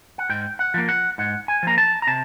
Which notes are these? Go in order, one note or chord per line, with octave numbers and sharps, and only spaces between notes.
F#5
G#2 G5
F#5
F3 A#3
F#5
G#2 F#5
G#5
F3 A#3 A#5
A5
A#5
C3 A5